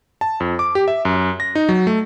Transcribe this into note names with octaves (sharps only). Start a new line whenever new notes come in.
A5
F2
D6
G4
E5
F#2
A#6
D#4
F#3
A3